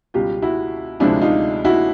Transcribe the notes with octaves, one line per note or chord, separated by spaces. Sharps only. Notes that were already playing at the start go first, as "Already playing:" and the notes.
C#2 B2 G3 F4 G4
E4 F#4
D2 C3 F3 G#3 D4 E4
D#4 F4
E4 F#4